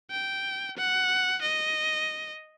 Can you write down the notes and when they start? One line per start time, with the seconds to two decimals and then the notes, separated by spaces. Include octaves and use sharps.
0.11 G5
0.77 F#5
1.42 D#5